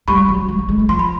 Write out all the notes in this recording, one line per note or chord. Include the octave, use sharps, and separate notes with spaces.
G3 B5 C#6
F#3
G3
G3
G#3
A3
F3 C6
B5